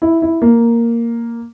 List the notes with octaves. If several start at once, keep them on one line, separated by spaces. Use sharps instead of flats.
E4
E4
A#3